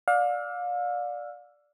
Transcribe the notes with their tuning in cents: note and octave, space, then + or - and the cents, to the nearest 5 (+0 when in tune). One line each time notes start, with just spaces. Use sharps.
D5 +0 F5 +35 E6 +20